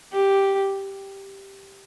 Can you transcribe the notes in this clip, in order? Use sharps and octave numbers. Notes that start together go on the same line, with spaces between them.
G4